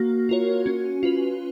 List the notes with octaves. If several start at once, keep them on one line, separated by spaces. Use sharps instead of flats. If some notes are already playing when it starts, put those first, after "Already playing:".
Already playing: A#3 F#4
F4 A#4 C#5
C#4
F4 B4